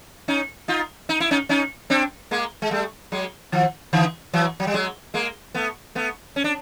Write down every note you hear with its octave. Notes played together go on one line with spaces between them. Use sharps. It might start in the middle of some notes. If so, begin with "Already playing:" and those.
C#4 D#4
D#4 F4
D#4
E4
C#4 D#4
C#4 D#4
C4 D4
G#3 A#3
G#3
G3 A3
F#3 G#3
D#3 F3
D3 E3
E3 F#3
F#3
G3
F#3 G#3
G#3 A#3
A3 B3
A3 B3
C#4
D4